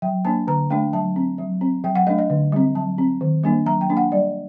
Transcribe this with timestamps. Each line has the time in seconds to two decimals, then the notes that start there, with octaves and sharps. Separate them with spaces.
0.02 F#3 G5
0.25 A#3 D4 A5
0.47 D3 A#5
0.70 A3 D4 G5
0.93 F#3 A5
1.16 C4
1.38 F#3
1.61 C4
1.84 F#3 G5
1.95 F#5
2.07 A3 D4 D#5
2.18 D#5
2.30 D3
2.52 G3 C4
2.75 F#3 A5
2.98 C4
3.21 D#3
3.44 G3 A#3 D4
3.66 F#3 A#5
3.81 G5
3.89 A#3 D4
3.97 F#5
4.12 G3 D5